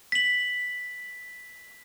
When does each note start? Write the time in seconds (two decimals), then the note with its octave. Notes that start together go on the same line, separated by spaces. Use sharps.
0.12 B6 F#7